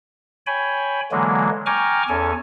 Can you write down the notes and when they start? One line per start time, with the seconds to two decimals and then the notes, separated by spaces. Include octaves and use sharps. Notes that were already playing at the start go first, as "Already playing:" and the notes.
0.47 C#5 G5 G#5 B5
1.12 D3 E3 F#3 G#3 A#3
1.66 G5 G#5 A#5 C#6 D6 F6
2.09 E2 C#4 A4 G#5